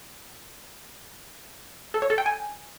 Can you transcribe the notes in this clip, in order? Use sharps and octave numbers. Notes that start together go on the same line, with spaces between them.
A4
C#5
A4
G5
G#5